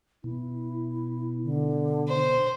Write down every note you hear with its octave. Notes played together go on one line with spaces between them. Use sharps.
B2 E4
D3
C5